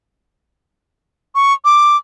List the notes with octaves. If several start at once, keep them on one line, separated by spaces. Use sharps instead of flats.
C#6
D6